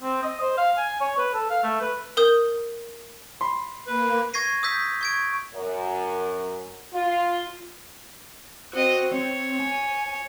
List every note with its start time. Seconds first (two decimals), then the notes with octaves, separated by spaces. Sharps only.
0.03 C4
0.22 D#5
0.41 C5
0.57 F5
0.77 G#5
1.01 C#5
1.17 B4
1.34 A4
1.50 F5
1.63 A3
1.81 B4
2.17 A#4 D#6 G6
3.41 B5 C6
3.87 A#3 B4
4.34 C#6 G#6 A#6 C7 D#7
4.63 D#6 E6 G6 B6
5.01 C#6 G#6 D7
5.55 F#2
6.94 F4
8.73 C4 F#4 D#5
9.12 C4 C#5
9.59 G#5